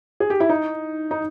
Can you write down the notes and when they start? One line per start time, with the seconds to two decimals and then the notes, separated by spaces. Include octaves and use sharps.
0.20 G#4
0.30 G4
0.40 E4
0.49 D#4
1.11 D#4